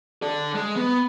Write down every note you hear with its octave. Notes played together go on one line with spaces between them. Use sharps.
A4 D5
G#3
B3